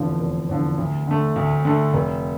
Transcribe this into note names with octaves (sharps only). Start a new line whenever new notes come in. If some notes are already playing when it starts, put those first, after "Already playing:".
Already playing: F1 E2 D3 F3
F1
E2 D3 F3
D2
D3 A3
D2
D3 A3
F1